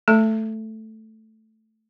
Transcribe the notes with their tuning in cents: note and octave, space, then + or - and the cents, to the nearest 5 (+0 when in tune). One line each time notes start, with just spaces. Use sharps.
A3 +0 A4 +0 A5 +35